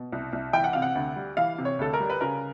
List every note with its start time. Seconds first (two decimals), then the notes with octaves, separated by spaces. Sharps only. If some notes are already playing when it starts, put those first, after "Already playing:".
Already playing: B2
0.12 C2
0.33 C2
0.53 E3 G5
0.64 F#5
0.73 C3 F5
0.82 F#5
0.95 D2
1.16 G3
1.37 E3 F5
1.58 C3
1.65 C#5
1.79 D2 A4
1.94 A#4
2.00 G3
2.10 B4
2.21 C#3 A#4